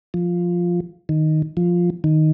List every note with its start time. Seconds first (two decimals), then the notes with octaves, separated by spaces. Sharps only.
0.14 F3
1.09 D#3
1.57 F3
2.04 D#3